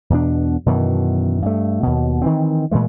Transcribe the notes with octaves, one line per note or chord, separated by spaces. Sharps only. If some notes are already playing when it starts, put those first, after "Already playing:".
E2 B2 D4
F#2 B2 D#3 E3
G2 A3
D#2 B2
D#3 E3 C4
A#2 E3 G#3 A3